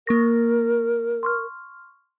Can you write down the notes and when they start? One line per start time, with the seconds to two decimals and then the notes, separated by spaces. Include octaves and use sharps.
0.07 A#3 A#4 C#6 A#6
1.23 C6 C#6 F6